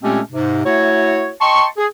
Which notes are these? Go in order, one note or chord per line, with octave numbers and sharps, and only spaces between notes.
A#2 G#3 A3 C4 C#4 G4
G#2 C3
A3 E4 F#4 C#5
D#5 G5 A5 C6 C#6
G#4